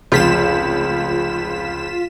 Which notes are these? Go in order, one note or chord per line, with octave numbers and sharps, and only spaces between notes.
F1 C#2 F4 B6 E7